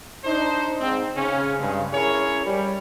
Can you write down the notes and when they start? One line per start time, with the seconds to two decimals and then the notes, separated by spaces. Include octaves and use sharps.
0.24 D4 D#4 C5
0.80 G#2 C4
1.16 C#3 C#4
1.59 G2 C#3 G#3
1.93 C#4 E4 G#4 A#4 C#5
2.46 G3